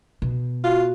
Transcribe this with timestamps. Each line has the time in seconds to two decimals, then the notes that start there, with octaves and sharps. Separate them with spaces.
0.22 B2
0.64 F4 F#4